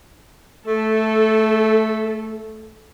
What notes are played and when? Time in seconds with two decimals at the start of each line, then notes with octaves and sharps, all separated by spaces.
0.66 A3 A4